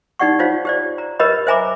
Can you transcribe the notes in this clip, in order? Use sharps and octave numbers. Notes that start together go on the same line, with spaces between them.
D#4 G4 D5 F#5 C#6
D#4 F4 C5 C#5 F5
G4 C5 D5
A#5
G4 A#4 B4 C#5 D#5 B5
C5 E5 G#5 A#5 B5 D6